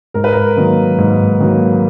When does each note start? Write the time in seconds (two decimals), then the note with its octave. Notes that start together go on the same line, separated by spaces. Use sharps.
0.14 G#2 A#4
0.24 B4
0.33 A#4
0.56 D#3 F#3 A#3
0.98 G#2
1.40 D#3 F#3 A#3